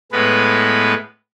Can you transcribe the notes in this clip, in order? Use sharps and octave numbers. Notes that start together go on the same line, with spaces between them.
A2 G#3 B3 B4